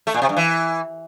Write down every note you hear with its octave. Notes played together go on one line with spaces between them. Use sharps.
A3
A#2
C3
G2
E3